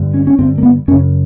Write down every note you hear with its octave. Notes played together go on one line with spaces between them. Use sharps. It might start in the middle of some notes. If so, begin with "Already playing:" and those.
Already playing: G2 D3
C#4
C#4
G2 D3 C4
A#3
B3
F#2 C#3 C#4